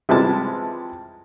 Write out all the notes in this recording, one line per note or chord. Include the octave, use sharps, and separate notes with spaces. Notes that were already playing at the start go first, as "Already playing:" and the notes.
C3 E3 F3 G3 G#3 A5